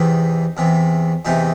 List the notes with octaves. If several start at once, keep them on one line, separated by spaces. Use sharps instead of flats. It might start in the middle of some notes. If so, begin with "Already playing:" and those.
Already playing: E2 C3 E3 D#4
E2 C3 E3
E2 C3 E3 D#4